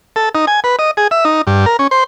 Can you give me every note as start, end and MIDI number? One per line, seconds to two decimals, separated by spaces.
0.16 0.29 69
0.35 0.45 63
0.47 0.60 80
0.64 0.76 71
0.79 0.91 75
0.97 1.07 68
1.11 1.24 76
1.25 1.42 63
1.47 1.66 43
1.66 1.77 70
1.79 1.87 61
1.91 2.04 72